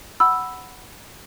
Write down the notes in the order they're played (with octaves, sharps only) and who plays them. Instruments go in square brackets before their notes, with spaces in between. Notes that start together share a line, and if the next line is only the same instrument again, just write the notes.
[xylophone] F#5 B5 E6